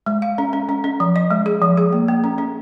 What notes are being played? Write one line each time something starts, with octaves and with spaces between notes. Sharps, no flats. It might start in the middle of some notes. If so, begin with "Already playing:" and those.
G#3
F5
C#4
C#4
C#4
C#4
F3
D#5
G#3
G#4
F3
G#4
A#3
A#3
C#4
C#4